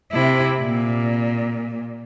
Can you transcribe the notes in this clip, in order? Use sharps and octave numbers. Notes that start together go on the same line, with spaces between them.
C3 E4
A#2